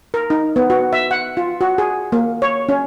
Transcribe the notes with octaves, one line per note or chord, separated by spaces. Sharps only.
A#4
D#4
B3
F#4
E5
F#5
F4
F#4
G#4
A#3
C#5
C#4